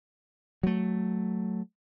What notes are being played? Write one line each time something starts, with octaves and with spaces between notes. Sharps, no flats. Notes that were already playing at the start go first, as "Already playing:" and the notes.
F#3 A3